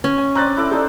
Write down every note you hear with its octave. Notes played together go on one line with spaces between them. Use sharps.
C#4
G#5
C4 D4 A#5 F#6 A6
E4 A4 D6
D#4 A4 C5 D5